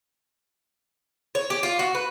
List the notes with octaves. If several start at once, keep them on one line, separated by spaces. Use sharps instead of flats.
C#5
G4
F4
F#4
B4